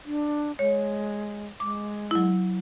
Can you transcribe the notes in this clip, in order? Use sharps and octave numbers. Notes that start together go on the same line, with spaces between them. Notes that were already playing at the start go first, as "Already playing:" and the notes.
D4
G#3 C#5
G#3 D6
F#3 E4